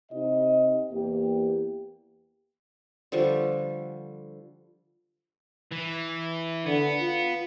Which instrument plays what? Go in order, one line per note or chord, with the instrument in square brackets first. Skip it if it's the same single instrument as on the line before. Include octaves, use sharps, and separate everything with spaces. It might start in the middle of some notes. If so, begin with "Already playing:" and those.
[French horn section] C3 D#4 D#5
E2 A#3 G4
[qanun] D3 F3 G3 C#6
[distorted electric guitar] E3
[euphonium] D3 [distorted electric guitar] B3
[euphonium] F4